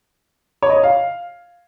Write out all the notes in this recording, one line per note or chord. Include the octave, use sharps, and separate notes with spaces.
C#5
D#5
C#5
F5